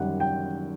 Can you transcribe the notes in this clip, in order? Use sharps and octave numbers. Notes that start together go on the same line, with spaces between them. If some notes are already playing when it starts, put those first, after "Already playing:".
Already playing: F#2 D#3 G3 F#5
G5